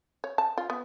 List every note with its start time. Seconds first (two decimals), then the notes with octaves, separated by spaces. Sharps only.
0.24 C#5
0.38 A5
0.58 F4
0.70 B3